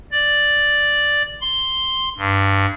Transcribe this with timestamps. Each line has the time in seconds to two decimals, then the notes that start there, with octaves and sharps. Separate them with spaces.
0.12 D5
1.41 C6
2.18 G2